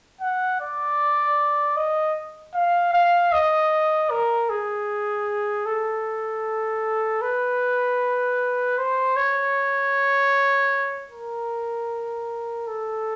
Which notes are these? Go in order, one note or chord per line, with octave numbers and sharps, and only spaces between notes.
F#5
D5
D#5
F5
F5
D#5
A#4
G#4
A4
B4
C5
C#5
A#4
A4